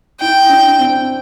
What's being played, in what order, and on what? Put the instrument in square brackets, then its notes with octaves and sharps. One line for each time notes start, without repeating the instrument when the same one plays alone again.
[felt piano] E4 [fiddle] G5
[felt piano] D4
C4